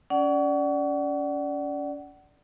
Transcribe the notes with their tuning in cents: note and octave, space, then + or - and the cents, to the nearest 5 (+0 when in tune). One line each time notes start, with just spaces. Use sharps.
C#4 +30 D5 +0 F#5 +25